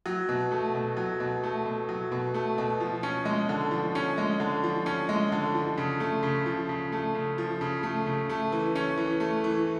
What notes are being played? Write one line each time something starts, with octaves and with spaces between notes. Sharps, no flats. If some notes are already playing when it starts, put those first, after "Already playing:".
F#3
B2
A3
B2
F#3
B2
A3
B2
F#3
B2
A3
B2
F3
C#4
G#3
D3
F3
C#4
G#3
D3
F3
C#4
G#3
D3
F3
C#3
A3
C#3
F3
C#3
A3
C#3
F3
C#3
A3
C#3
A3
E3
C#4
E3
A3
E3